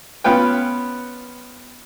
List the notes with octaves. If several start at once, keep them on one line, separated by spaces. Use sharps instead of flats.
B3 C#4 F4 B4 G5